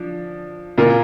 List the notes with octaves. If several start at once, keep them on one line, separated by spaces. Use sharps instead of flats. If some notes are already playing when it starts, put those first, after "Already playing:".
Already playing: F3 D4
A#2 A#3 F4 A#4